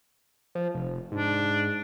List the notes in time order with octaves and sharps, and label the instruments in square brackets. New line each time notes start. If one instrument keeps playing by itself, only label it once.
[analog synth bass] F3
F1
[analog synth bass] G#2 [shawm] D4